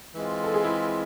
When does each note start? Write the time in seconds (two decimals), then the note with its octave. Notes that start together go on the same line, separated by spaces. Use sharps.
0.14 E3 G#3 C4 F4
0.44 A4
0.54 G#4
0.64 E4